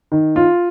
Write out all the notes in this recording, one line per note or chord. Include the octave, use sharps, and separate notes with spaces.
D#3
F4